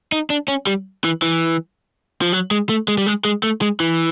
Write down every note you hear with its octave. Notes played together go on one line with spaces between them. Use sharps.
D#4
D4
C#4
G3
E3
E3
F3
F#3
G#3
A3
G#3
G3
G#3
G#3
A3
G#3
E3